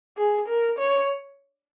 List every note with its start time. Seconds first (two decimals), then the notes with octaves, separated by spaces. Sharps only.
0.17 G#4
0.48 A#4
0.79 C#5